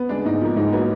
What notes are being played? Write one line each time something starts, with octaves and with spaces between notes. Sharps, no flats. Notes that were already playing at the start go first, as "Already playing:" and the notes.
Already playing: B3
G#3 D4
G#2 D#4
F3 A#3
G#2 D#4
F#3 A#3 B3